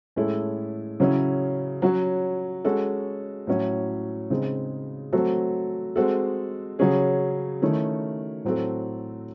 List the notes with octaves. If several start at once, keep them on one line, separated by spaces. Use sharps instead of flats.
A2 G#3 C#4 E4 A4
C#3 F#3 C#4 E4
F#3 C#4 F#4
G#3 C#4 F#4 A4
A2 F#3 C#4 E4
C#3 G#3 C4 D#4
F#3 A3 C4 F#4 A4
G#3 C4 F#4 A4
C#3 F#3 C#4 G#4
D#3 A3 C#4 E4
A2 F#3 C4 F#4 A4